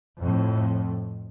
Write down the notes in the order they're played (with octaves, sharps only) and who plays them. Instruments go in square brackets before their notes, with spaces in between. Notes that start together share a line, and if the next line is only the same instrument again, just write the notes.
[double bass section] F2 A2